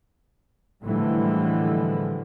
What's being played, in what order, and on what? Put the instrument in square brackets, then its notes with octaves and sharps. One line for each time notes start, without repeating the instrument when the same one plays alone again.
[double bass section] A2 D3 E3 F3 G3 G#3